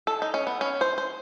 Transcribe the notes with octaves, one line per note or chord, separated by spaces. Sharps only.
A4
D#4
C#4
B3
C#4
C5
C5